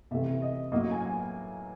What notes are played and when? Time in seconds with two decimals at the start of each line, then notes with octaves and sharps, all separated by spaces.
0.11 C3 E3 A3 E5
0.42 D#5
0.72 A2 F#3 A#3 D#5
0.91 G#5
1.02 G#5